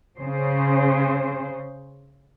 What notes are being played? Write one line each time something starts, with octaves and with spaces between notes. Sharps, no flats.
C#3 C5